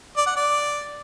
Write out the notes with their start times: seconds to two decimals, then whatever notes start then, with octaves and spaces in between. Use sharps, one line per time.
0.17 D5
0.27 F#5
0.36 D5